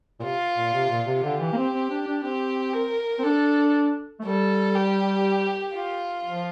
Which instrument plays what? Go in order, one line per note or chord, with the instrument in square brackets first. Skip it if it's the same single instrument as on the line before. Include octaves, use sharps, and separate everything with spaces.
[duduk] A#2
[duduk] C3 [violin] F4
[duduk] A#2
C3
A#2
C3
[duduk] D3 [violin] G4
[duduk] E3
A#3
C4
C4
D4
D4
[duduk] C4 [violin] G4
[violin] A#4
[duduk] C4
[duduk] D4 [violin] A4
[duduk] A3
[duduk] G3 [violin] A4
[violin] G4
F4
[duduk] F3